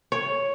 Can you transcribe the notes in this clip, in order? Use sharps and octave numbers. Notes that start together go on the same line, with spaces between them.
C#5